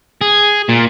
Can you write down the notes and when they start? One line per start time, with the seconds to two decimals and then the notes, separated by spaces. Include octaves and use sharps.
0.21 G#4
0.69 A#2